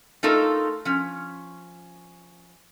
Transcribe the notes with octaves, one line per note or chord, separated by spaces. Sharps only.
A3 D#4 F4 A4 A#4
F3 C#4